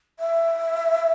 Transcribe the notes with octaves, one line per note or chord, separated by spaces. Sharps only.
E5